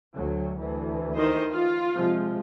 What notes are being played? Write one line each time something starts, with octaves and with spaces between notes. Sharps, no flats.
D2 F#3
D2 E3
D#3 C5 D#5
F4
C3 F3 G#3